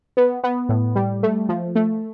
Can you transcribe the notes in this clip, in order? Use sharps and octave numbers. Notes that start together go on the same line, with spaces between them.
B3
B3
A2
G3
A3
F3
A3